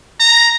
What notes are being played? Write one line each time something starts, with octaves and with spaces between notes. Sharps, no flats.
A#5